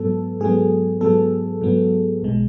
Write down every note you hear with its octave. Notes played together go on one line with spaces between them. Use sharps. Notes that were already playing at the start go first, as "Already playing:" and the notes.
Already playing: G#2 F#3 B3 A4
G#2 F#3 B3 G#4
G#2 F#3 B3 A4
G#2 F#3 B3
B1 B2 G#3